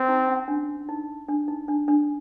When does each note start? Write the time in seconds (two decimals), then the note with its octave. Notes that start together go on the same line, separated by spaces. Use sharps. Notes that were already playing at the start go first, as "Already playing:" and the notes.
Already playing: C4
0.09 D#4
0.28 C#4
0.48 D4
0.89 D#4
1.28 D4
1.48 D#4
1.68 D4
1.88 D4